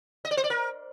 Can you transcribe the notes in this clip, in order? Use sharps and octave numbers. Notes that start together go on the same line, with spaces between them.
D#5
D5
C5
D5
A#4